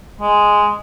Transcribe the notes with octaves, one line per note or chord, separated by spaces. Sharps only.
G#3